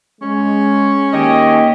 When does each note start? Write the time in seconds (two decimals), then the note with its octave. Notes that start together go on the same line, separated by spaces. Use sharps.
0.22 G#3 C#4
1.13 D#3 A#3 G4 D#5